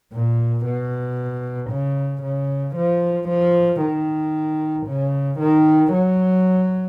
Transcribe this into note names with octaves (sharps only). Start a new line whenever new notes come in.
A#2
B2
C#3
C#3
F3
F3
D#3
C#3
D#3
F#3